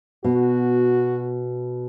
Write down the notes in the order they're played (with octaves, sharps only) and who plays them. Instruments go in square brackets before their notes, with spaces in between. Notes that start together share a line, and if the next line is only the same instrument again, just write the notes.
[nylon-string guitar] B2 [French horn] F#4